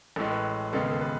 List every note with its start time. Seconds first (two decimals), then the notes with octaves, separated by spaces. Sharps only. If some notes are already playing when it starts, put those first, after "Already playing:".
0.16 A1 A2 G#3 A4
0.30 B4
0.73 E1 D#2 C#3 G#3 B3 A4
0.91 A4
1.01 B4